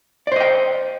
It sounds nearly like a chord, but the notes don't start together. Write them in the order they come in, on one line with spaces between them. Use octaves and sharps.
D5 C5 D#5 G5